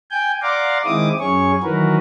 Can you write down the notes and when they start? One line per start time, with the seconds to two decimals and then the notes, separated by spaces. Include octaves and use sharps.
0.11 G5 G#5 G6
0.42 D5 F5 F#5 A#5 C6 D6
0.86 D#3 G#3 C4 E4 D6 D#6
1.20 F#2 C#4 G#4 C#5 C#6
1.63 D#3 E3 F#3 F#4 A#4 B4